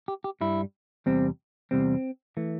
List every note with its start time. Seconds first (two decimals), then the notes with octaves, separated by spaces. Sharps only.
0.08 G4
0.24 G4
0.41 G2 G3 E4
1.06 E2 C3 G3 C4
1.71 E2 C3 G3 C4
2.37 E3 A3